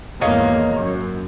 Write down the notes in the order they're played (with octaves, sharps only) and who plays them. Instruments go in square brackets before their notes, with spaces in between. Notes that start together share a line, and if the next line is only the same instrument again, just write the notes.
[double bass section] G#1 E2 A#3 [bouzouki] C#5 D#5 F5
[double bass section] F#2